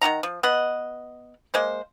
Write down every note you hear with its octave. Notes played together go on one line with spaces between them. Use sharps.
D#3 F#4 F#5 A#5
F3
B3 D#5 F#5
G#3 A#3 C5